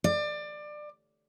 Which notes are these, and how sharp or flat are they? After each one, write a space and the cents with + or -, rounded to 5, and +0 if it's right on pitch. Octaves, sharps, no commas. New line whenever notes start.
D5 +25